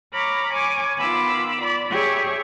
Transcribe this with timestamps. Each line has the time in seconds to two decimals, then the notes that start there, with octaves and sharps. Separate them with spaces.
0.13 C#5 A#5 B5 D6 F6
0.52 C#5 G#5 D6
0.97 D#3 B3 F4 B5 D6 E6
1.59 D5 B5
1.91 G4 G#4 C#5 E5